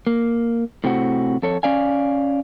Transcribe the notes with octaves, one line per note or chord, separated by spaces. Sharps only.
A#3
A2 C3 C4 F#4
F2 A4 C#5
C#4 D5 F5 G#5